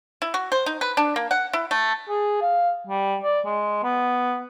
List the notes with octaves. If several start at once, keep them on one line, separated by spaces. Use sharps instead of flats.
E4
F#4
C5
D#4
B4
D4
A#3
F#5
E4
A3
G#4
F5
G3
D5
G#3
B3